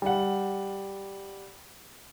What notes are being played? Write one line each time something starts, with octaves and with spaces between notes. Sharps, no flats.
G3 F#5